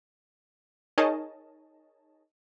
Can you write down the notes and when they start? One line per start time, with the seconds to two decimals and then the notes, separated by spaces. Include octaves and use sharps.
0.98 D#4 G#4 A#4 C#5 D#5 A5